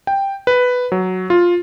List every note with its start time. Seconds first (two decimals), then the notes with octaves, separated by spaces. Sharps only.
0.07 G5
0.47 B4
0.92 F#3
1.30 F4